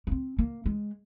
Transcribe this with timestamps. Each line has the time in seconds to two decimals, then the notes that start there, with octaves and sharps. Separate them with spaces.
0.07 A#3
0.11 C4
0.39 A#3
0.66 G#3